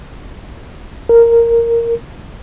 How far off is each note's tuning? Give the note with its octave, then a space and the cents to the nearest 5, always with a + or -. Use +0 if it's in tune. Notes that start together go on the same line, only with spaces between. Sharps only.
A#4 -5